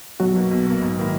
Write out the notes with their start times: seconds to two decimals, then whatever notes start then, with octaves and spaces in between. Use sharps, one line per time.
0.20 B1 F#3 F#4
0.35 B2 A#3
0.51 B1
0.66 B2 A#3
0.82 G#2
0.97 D#3 A#3 E4